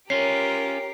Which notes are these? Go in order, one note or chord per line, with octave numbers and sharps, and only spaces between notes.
C#4 F4 G4 A#4 C#5 C7